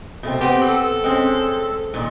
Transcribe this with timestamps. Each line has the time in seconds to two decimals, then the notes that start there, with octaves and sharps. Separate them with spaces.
0.23 B2 A3 C4
0.41 B3 C4 G4
0.62 A4
1.04 G#3 C4 C#4
1.94 A#2 D3 D#3